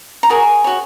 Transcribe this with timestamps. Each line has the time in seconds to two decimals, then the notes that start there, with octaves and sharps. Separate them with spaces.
0.23 A#5
0.29 F#4 G#4 A#4 C#5 G#5
0.64 F#4 C#5